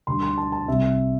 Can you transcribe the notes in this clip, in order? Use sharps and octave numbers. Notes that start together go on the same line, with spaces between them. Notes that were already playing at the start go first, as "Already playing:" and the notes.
D2 D3 G3 C6
C6
A5
A5
C2 C3 G3 E5